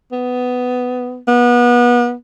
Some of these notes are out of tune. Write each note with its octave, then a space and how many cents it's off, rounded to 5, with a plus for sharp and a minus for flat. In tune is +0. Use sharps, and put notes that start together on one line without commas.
B3 +15
B3 -30